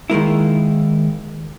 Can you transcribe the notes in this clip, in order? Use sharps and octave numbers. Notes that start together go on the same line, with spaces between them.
D#3 G#3 A#3 E4